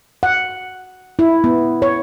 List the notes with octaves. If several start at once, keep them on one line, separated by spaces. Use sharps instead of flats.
F#5
E4
B3
C#5